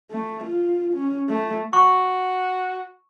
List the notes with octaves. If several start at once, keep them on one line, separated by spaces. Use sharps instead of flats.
A3
F4
C#4
A3
F#4 C#6